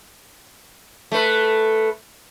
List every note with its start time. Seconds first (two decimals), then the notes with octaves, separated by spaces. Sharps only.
1.12 A3 B4